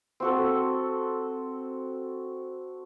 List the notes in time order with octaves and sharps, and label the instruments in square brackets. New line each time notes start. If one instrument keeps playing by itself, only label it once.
[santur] C4 F#4 A4